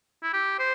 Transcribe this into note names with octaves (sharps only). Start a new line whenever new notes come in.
E4
G4
C5